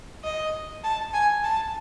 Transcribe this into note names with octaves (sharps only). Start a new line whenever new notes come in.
D#5
A5
G#5
A5